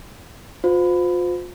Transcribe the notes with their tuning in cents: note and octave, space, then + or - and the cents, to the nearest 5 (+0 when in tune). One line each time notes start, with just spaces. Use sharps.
F4 +35 C5 -30